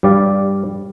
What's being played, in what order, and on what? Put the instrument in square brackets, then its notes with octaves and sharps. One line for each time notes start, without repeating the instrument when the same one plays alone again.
[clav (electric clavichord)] G2 G3 D5 F5